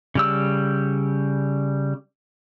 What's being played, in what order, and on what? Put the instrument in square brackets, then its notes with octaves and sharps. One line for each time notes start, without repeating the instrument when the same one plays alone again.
[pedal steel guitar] C#3 G3 E6